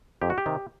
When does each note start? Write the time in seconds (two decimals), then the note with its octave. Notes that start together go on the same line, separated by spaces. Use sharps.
0.22 F2 G4
0.30 F#4
0.38 G4
0.46 C3 D#3